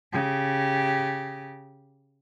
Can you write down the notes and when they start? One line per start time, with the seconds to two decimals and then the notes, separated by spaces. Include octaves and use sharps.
0.12 C#3 G4